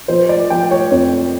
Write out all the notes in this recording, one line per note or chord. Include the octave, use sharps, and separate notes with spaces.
F3 C5
D5
F3 G5
C#5
F2 C#5